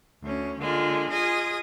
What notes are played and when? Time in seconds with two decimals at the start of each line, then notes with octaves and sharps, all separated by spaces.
0.22 D2 C#4
0.61 D3 G#3 A#3 F4
1.10 F4 G#4 D#5 G#5 D#6